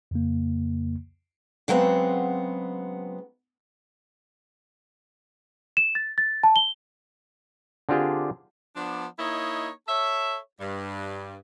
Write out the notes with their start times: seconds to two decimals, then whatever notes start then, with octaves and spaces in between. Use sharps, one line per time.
0.11 F2 C#3 A#3
1.68 C#3 F#3 G#3 B3 C4
5.77 E7
5.95 A6
6.18 A6
6.43 A5
6.56 G7
7.89 D3 C4 D4 F4 G4 G#4
8.75 F3 B3 D4
9.19 A#3 D#4 E4 C#5 D#5
9.87 A4 C#5 E5
10.59 G2